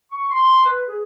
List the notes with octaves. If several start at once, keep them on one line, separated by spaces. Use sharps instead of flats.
C#6
C6
B4
G#4